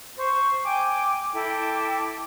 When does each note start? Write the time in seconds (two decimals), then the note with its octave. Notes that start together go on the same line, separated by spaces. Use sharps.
0.17 C5 C#6
0.64 G5 G#5 D6
1.34 E4 A4 G5 D6